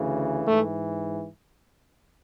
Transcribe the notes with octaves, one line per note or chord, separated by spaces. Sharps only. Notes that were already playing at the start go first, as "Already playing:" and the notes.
Already playing: D2 C#3 E3
G#2 E3 A3